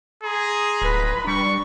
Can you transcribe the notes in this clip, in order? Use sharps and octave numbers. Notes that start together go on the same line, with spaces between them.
G#4 A#5 C6
D1 B4 B5
G3 D4 C#6